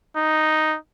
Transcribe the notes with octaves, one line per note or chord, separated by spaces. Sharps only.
D#4